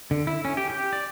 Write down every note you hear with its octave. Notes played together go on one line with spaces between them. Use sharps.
D3
E4
C#4
G4
G4
D5